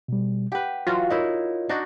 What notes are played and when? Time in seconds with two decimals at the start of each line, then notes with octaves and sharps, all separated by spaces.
0.08 B2 G3
0.52 G4 B4 F#5 G5
0.87 E3 F#3 F4 F#4
1.10 D#4 E4 A#4 C#5 D#5
1.69 D4 D#4 F#4 D#5